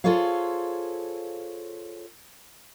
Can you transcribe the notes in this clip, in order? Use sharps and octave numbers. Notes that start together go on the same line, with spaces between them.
F4 G#4 A4 C5 C#5 F5